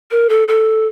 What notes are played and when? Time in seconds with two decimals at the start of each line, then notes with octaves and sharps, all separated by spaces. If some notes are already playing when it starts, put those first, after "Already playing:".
0.11 A#4
0.29 A4
0.48 A4